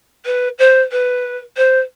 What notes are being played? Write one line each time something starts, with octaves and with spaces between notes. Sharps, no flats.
B4
C5
B4
C5